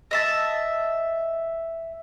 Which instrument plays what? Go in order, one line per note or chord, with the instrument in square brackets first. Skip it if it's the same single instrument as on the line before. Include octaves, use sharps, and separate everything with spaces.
[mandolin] D#5 E5 A5